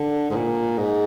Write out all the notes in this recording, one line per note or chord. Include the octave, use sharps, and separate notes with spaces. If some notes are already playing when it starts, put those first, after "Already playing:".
Already playing: D3
G#2
A#2
G#2